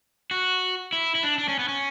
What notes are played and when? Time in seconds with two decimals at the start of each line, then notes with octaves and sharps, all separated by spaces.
0.31 F#4
0.93 E4
1.15 E4
1.23 D4
1.38 D4
1.48 C#4
1.59 B3
1.68 C#4